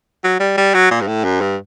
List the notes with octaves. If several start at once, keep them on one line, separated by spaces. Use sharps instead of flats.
F#3
G3
G3
F#3
A#2
G2
A2
F#2
G2